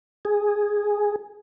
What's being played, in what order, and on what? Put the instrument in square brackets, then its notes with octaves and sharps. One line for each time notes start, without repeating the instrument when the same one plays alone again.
[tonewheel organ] G#4